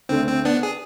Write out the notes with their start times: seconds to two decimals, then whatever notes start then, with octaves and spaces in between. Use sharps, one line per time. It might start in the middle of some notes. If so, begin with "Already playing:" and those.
0.09 D2 D3 A3 C4
0.27 C4
0.45 B3 D4
0.63 G#4